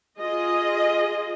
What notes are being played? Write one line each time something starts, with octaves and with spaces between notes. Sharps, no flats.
F4 G#4 D#5